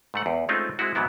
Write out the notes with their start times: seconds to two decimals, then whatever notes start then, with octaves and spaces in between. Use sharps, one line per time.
0.14 G#2 A3 F#5
0.26 E2
0.49 G#3 A3 C4 C#4 D#4 F4
0.79 G#3 C4 E4 F#4
0.95 G#2 E3 F#3 B3 E4